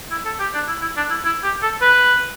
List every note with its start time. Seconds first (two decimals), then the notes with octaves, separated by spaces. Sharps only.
0.11 E4
0.25 A4
0.40 G4
0.54 D4
0.68 E4
0.82 E4
0.97 D4
1.10 E4
1.25 E4
1.44 G4
1.62 A4
1.81 B4